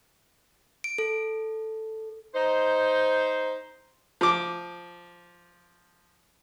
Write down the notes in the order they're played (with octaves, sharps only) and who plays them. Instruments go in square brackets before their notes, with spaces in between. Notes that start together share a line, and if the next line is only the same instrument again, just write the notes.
[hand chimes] D7
A4
[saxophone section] D#4 C5
[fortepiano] F3 D6